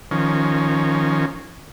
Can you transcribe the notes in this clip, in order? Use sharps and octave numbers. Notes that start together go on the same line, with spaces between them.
D#3 F3 C#4